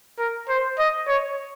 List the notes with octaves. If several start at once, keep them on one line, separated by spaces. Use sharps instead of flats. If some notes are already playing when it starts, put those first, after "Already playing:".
A#4
C5
D#5
C#5